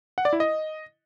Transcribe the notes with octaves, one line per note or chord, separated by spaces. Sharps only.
F#5
D5
E4
D#5